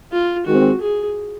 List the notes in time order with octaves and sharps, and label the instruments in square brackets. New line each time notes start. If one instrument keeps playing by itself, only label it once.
[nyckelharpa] F4
[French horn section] D#3 G#3 C4 [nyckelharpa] F#4
[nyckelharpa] G#4